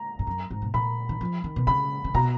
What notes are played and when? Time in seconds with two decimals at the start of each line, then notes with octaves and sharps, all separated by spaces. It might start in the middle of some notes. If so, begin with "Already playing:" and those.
Already playing: A#5
0.19 G#2
0.27 F#2
0.51 G#2
0.62 B2
0.74 A#2 B5
1.09 D#3
1.21 F3
1.44 D#3
1.56 B2
1.67 C#3 B5
2.04 C#3
2.14 B2 A#5